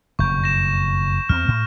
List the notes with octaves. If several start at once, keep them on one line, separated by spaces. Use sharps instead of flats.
F#1 F2 B2 C#6 G6
A#6 E7
E2 C4 F6
A2